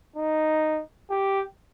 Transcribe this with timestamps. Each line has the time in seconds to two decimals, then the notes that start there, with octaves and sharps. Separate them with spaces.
0.16 D#4
1.10 G4